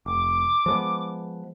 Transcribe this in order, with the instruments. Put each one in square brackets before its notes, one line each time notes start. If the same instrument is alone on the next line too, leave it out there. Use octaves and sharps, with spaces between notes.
[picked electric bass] F1 [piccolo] D6
[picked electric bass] F3 G#3 B3